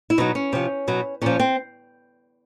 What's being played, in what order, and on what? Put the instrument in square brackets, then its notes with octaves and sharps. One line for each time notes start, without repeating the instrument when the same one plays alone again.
[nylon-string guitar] E4
B2 F#3 D#4
C#4
C3 F3
B2 F#3
A#2 F3 C#4
C4